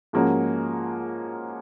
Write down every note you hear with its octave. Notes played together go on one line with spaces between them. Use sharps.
G#2 F3 A#3 C#4 F#4